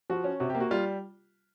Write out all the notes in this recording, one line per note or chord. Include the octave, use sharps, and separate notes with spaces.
F3 F#4
C#4
C3 F#4
G4
A#3
F#4
G3 F4